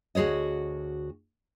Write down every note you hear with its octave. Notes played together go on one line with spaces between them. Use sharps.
D2 F#4 G#4 C#5 D#5